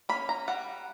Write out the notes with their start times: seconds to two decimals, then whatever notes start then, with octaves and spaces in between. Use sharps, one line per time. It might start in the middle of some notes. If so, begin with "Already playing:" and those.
0.09 A#3 B5
0.13 C#4
0.29 A#5
0.48 G3 F#5